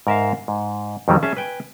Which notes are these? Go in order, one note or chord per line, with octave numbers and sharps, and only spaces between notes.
G#2 A#4 E5 F5
G#2
F2 D#3 F#3 G3
C#4 G#4 E5 A5
B4 G5 G#5